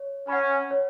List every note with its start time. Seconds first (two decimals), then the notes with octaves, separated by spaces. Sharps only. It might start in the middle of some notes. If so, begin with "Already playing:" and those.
Already playing: C#5
0.28 C#4 F#5 B5
0.71 C#5